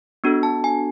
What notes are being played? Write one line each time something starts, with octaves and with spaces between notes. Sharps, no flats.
B3 D4 F#4 A4
A5
G#5